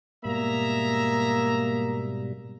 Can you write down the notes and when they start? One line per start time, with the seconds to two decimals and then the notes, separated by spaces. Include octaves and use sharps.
0.25 G#2 B2 G3 A#3 G#4 E5 A#5